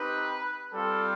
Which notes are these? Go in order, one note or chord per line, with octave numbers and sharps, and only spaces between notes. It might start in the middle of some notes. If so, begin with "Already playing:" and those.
Already playing: C4 D#4 G4 B4
G3 C4 F4 A4